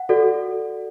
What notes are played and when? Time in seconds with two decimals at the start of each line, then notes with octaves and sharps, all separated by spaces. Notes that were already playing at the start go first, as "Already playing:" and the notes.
Already playing: F#5
0.09 F#4 A4 D5